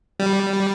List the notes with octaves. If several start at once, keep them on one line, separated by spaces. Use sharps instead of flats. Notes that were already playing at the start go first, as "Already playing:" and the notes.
G3